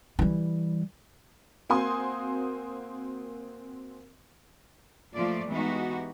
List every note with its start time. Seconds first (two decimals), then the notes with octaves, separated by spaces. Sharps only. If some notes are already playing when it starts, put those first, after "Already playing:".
0.19 E3 G3
1.70 A#3 C4 F#4 G#5 C6 D#6
5.15 F3 A3 A#3 F4 D5
5.50 E3 G#3 B3 D#4 F#4 G4